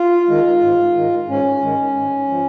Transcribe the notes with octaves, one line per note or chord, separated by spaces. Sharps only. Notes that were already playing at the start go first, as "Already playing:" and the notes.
Already playing: F4
D#3 G#3
G#2
D#3 G#3
G#2 C#4
D#3 G#3
G#2
F3